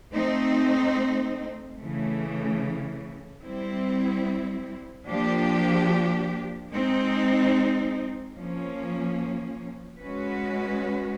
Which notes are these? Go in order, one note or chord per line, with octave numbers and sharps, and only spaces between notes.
A3 C4 D#4
C#3 E3 A3
G3 C4 E4
F3 A#3 D4 G4
G#3 C4 D#4
F3 A#3 C#4
G#3 C#4 F#4 B4